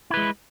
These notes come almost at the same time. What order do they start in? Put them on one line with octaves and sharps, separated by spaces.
E4 B4 G#3